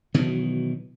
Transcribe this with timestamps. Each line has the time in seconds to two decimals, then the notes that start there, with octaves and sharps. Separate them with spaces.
0.14 B2 D#3 E3 F#3